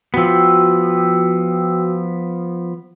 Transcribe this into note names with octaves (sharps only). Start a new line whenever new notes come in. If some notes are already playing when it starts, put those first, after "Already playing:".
F3 B3 F#4 G5 E6